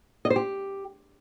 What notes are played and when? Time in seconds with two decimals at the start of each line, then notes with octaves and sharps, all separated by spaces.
0.25 D#5
0.30 C5
0.36 G4